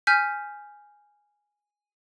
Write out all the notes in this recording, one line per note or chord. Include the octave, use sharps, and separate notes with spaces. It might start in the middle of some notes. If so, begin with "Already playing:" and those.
G#5 F6 G6 B6